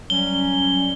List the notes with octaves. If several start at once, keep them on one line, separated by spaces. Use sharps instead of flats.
F#3 G3 C#4 G7